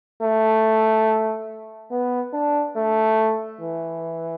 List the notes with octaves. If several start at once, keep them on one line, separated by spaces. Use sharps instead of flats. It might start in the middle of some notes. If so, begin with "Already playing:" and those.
A3
B3
D4
A3
E3